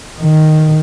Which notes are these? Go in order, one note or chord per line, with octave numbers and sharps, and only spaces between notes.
D#3